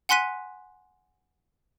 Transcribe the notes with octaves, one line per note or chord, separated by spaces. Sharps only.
F#5 G#5 C6 F#6 B6 D#7